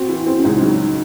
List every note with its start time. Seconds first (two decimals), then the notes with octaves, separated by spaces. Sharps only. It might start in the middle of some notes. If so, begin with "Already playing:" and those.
Already playing: C4 F#4
0.09 E3
0.26 C4
0.40 C#4
0.44 C#2 D#4
0.62 F#3